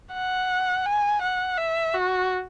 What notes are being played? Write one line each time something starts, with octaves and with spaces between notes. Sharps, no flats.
F#5
G#5
F#5
E5
F#4